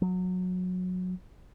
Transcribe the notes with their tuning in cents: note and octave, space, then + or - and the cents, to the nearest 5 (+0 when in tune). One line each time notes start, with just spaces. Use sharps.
F#3 -20